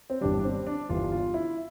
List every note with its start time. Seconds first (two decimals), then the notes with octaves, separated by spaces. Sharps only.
0.10 C4
0.21 G1 G2 E3 G3 D4
0.39 D4
0.44 C4
0.67 D4
0.89 G1 G2 E3 G3 F4
1.12 F4
1.34 E4